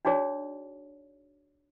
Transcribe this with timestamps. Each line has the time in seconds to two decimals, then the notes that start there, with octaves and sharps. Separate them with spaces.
0.05 D4 D#4 F#4 G#4 C#5 D5